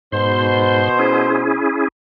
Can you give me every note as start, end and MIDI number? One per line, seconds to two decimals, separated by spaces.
0.12 0.89 44
0.12 1.59 47
0.12 1.59 72
0.12 0.89 84
0.99 1.88 61
0.99 1.88 64
0.99 1.88 68